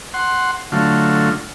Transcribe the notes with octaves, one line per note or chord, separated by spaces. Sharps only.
F#5 C6
D3 F#3 A3 F4